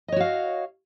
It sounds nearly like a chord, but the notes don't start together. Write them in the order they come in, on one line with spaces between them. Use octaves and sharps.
D#5 C#5 F#4 F5